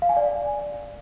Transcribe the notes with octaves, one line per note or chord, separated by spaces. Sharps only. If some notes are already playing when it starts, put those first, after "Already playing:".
F5
G#5
D5